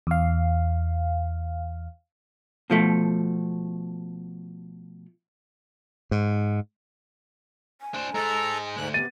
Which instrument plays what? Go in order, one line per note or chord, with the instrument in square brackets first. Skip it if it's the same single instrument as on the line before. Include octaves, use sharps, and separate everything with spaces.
[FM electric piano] E2 F5
[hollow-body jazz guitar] B2 F3 A3
[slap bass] G#2
[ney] G#5
[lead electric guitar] D4 C5
[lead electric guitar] G#2 G#3 [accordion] A4 A#5
[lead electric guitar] D2 [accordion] G#2 F#6
[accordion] C3 [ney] B3 [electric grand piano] A6 D#7